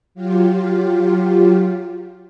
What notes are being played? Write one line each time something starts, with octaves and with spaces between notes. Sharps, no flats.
F#3 F4 G4